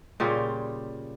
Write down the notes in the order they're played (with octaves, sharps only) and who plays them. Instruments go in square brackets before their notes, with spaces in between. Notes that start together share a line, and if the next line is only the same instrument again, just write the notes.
[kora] A#2 C#3 G3 F4